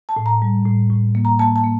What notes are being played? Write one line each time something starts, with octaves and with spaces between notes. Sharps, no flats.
A5
A2
A#5
G3
A2
A2
A#3
A#5
A#3 A5
A5
A#3